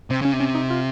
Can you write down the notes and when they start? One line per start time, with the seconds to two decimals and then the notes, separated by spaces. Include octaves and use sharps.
0.10 C3 C4
0.22 C#3 C#4
0.33 C3
0.40 C#4
0.55 D#4
0.70 F4